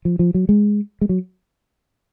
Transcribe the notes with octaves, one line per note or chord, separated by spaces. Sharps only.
F3
F3
F#3
G#3
G#3
F#3